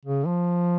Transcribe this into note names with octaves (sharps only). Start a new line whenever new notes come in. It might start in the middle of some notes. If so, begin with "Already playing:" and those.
C#3
F3